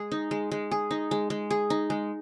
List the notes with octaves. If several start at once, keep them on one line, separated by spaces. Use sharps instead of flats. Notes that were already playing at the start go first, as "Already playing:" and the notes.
Already playing: G#3 G#4
D#4
G#3
G#3
G#4
D#4
G#3
G#3
G#4
D#4
G#3